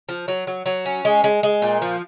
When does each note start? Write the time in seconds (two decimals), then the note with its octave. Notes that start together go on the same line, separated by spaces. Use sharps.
0.09 F3
0.28 F#3
0.47 F#3
0.66 F#3
0.85 C#4
1.05 G#3
1.24 G#3
1.43 G#3
1.62 A#2
1.82 F3